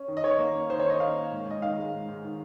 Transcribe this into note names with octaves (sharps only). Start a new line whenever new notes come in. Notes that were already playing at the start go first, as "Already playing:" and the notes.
Already playing: C#4
D#3
D#5
D#3 C#5
A#3
C#4
D#3 C5
C#5
D#3
D#5
A#3 F5
C#4
G#2
G#2 D#5
D#3 F5
G#3
G#2
G#2
D#3